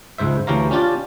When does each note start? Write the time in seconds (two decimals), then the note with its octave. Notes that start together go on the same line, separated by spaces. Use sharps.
0.18 C#2 G#2 C5 E5
0.47 D2 E3 G4 C#5 F5 A#5
0.71 C#4 D4 F4 G4 D5